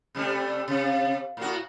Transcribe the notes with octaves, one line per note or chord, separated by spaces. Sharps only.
C3 G3 A3
C3
A2 F#4